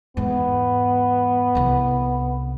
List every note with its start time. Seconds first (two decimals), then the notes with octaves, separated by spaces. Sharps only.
0.17 E2 G#2 B3
1.55 C2 D3